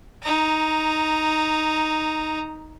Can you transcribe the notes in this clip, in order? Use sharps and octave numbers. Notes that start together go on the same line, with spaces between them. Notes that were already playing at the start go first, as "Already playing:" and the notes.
D#4 A#5